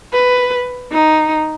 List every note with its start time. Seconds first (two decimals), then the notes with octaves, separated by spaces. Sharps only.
0.13 B4
0.92 D#4